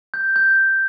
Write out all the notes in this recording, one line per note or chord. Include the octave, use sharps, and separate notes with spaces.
G6
G6